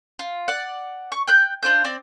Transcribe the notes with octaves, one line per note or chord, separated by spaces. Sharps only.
F4
D5 F#5
C#6
G5 F#6 G6
D4 F4 C5 G6
C4 D5